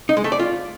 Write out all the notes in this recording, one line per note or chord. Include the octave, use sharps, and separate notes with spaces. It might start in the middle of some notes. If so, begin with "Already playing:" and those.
D#4
G#3
A3
D5
F4